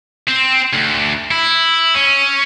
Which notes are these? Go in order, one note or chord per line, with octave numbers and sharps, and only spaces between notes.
C4
D2
E4
C#4